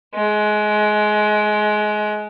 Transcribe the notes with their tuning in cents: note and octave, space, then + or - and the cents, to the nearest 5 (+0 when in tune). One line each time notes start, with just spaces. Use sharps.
G#3 +25